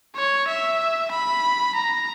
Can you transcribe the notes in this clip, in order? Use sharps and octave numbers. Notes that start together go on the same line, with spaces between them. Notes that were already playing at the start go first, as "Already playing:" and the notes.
C#5
E5
B5
A#5